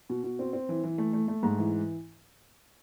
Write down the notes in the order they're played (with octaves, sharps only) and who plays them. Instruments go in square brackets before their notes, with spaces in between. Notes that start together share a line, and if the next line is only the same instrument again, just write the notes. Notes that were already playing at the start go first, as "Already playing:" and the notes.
[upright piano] B2
B2
C4
C4
E3
E3
A3
A3
A3
G#2
E3